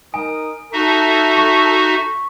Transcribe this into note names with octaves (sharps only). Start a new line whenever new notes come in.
D#4 A#4 G#5 D#6
D#4 F#4 A4 E5
C#6 B6